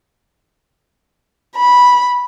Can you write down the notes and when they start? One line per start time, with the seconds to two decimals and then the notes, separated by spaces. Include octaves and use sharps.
1.56 B5